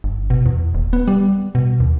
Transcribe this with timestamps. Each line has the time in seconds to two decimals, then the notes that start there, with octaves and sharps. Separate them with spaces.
0.04 G1
0.30 B2
0.46 E2
0.75 D#1
0.93 B3
1.08 G3
1.55 B2
1.80 D#2